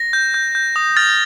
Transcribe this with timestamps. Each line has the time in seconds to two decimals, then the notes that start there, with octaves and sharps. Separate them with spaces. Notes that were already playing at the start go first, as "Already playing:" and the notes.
Already playing: A#6
0.13 G6
0.34 G6
0.55 G6
0.76 D#6
0.97 F6 A6